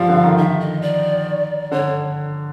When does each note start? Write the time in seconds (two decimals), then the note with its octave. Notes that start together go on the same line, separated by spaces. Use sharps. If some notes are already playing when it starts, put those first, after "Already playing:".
Already playing: F3 G3 F5
0.09 D3
0.23 D#3
0.37 D#3 E5
0.60 D#5
0.82 D5
1.71 D3 C#5